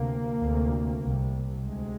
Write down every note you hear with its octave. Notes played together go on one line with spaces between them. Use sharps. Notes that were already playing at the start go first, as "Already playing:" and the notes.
Already playing: D2 C3 A#3
D2 C3
C2 C3
D2 C3 G#3